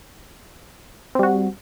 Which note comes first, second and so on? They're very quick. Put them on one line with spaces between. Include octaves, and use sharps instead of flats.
C4 G3 F#4